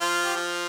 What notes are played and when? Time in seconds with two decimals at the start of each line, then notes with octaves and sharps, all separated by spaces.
0.01 F3 F4
0.25 G4
0.35 F3 F4